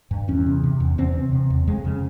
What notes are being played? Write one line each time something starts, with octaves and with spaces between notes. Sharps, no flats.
G2
E2 C#4
C3
C3
E2
E2 C4
C3
C3
E2
F2 G#3
C#3